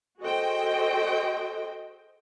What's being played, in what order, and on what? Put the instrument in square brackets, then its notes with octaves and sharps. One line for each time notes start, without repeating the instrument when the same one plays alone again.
[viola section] F#4 G#4 A4 C5 D#5 G5